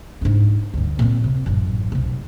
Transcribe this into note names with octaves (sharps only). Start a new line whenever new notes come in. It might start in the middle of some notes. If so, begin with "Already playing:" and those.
G#2 D4
D2 G2
A#2 C4
C3
A1 F#2
F1 B1